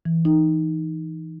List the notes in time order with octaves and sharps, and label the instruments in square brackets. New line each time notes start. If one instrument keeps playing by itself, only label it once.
[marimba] E3
D#4